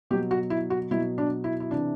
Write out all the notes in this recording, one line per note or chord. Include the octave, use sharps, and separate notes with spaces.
B2 F#3 G4
F#4
E4
F#4
B2 F#3 E4
D4
E4
E4
C3 E3 D4